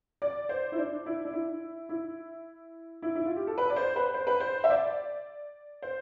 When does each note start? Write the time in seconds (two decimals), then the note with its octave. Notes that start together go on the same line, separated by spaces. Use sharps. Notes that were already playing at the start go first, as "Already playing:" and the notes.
0.22 D5
0.49 C5
0.72 E4
0.78 D4
1.06 E4
1.25 D4
1.34 E4
1.89 E4
3.02 E4
3.15 E4
3.25 F4
3.36 G4
3.47 A4
3.58 B4
3.70 D5
3.76 C5
3.96 B4
4.14 C5
4.27 B4
4.40 C5
4.64 E5
4.70 D5
5.82 C5